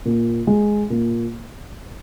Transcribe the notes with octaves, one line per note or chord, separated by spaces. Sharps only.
A#2
G#3
A#2